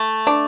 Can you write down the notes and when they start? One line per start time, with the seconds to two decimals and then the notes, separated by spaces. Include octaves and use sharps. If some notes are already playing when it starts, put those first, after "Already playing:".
Already playing: A3
0.27 D4